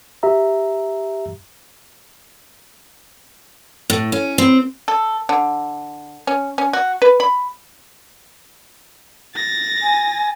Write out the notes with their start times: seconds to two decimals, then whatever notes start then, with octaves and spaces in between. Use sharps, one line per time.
0.23 G4 E5 A#5
3.90 A2
4.12 C#4
4.38 C4
4.88 A4
5.29 D3
6.27 C#4
6.58 C#4
6.73 F#4
7.02 B4
7.20 B5
9.35 A6 A#6
9.82 G#5